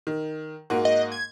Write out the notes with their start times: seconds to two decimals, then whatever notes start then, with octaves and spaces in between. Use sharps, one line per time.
0.07 D#3
0.70 G#2 A#3 F#4
0.85 D#5
1.12 G#6